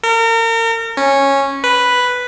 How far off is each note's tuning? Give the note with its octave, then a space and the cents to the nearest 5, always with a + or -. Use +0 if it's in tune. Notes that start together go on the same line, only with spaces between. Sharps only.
A#4 -35
C#4 -10
B4 +0